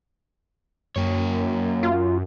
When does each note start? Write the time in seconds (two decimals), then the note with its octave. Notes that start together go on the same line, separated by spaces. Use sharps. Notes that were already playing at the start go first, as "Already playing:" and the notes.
0.96 F#2 A#3 C#5
1.83 F4